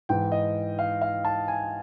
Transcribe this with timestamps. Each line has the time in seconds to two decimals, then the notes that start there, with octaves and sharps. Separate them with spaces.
0.09 G#2 E3 G5
0.32 D#5
0.79 F5
1.02 F5
1.25 A5
1.48 G#5